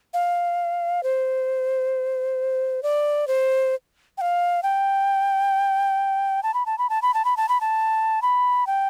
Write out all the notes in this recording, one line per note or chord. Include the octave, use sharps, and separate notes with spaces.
F5
C5
D5
C5
G5
F5
G5
A5
B5
A5
B5
A5
B5
A5
B5
A5
B5
A5
B5
G5